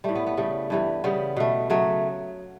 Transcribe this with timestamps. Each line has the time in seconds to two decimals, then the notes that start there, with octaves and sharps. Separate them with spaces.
0.04 A2 G3 A3
0.15 B3
0.27 B3
0.37 C#3 G3 A3
0.70 G2 E3 G3
1.04 C#3 G3 B3
1.36 B2 A3
1.70 C#3 F#3 A3